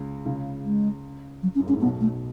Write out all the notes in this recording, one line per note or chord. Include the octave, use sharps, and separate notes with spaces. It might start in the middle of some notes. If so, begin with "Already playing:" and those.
Already playing: C#2 C#3
C#2 C#3
G#3
F#3
C#4
F#2
G#2 C#4
A2
B1 B2 B3
A3